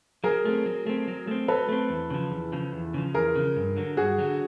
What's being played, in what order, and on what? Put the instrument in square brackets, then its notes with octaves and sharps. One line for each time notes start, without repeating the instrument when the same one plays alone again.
[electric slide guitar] F#3 [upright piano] G#4 A#4
[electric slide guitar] A3 C4
F#3
A3 C4
F#3
A3 C4
[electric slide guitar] F#3 [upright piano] A4 B4
[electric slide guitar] A3 C4
E2
C#3 F3
E2
C#3 F3
E2
C#3 F3
[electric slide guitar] E2 [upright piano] G#4 A#4
[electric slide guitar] C#3 F3
G2
D3 F#3
[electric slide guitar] G2 [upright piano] F#4 G#4
[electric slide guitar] D3 F#3